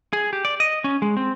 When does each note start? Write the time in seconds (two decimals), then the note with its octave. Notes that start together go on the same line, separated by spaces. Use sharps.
0.13 G#4
0.33 G4
0.45 D5
0.60 D#5
0.84 C#4
1.02 G#3
1.17 C4